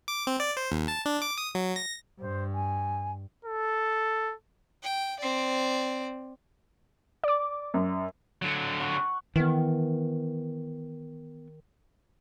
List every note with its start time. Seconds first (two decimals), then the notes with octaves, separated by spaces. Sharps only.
0.08 D6
0.27 C4
0.40 D5
0.57 C5
0.72 D#2
0.88 A5
1.05 D4
1.22 D6
1.38 D#6
1.55 F#3
1.76 A#6
2.20 G2 C5
2.54 G#5
3.45 A4
4.84 G5
5.20 C4 D5
7.24 D5 D6
7.74 F#2
8.42 D3 F#3
8.80 F#5 C#6
9.36 D#3 E3 B3